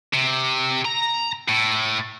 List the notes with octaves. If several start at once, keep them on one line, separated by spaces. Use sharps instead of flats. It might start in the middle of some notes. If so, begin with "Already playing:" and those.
C3
A#5
A2